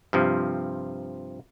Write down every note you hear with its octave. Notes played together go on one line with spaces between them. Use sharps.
G2 C3 F3